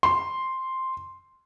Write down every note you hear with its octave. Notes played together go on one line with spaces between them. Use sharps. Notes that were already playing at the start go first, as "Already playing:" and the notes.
C6